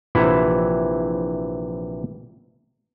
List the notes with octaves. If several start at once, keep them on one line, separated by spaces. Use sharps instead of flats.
A#1 C3 E3 E4 E5 F#5